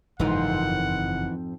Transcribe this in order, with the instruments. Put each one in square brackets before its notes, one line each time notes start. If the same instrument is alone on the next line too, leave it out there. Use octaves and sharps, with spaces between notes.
[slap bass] F#1 [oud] F2 G#2 F3 [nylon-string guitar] E3 D#4 A#4 [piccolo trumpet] F#5